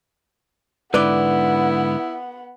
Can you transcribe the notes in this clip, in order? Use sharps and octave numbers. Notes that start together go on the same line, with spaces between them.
G#2 D3 B3 E4 B4 D5 F#5